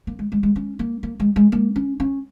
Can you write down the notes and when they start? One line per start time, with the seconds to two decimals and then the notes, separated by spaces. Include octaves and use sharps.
0.07 A#3
0.19 G#3
0.32 G#3
0.43 G#3
0.56 C#4
0.79 A#3
1.03 A#3
1.20 G#3
1.36 G#3
1.52 A#3
1.76 C#4
2.00 C#4